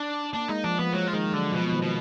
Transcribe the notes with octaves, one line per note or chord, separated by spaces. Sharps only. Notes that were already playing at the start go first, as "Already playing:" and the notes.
Already playing: D4
A#3 D4
G#3 D#4
F3 D4
F3 B3
F#3 G#3
F3
D#3 G#3
G#3
D3 F#3
B2 F3
D#3
B2